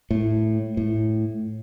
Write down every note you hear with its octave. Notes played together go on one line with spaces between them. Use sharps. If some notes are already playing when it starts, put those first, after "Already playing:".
A2
A2